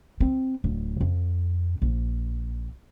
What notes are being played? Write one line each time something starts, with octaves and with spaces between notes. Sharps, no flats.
C4
D1
F2
A#1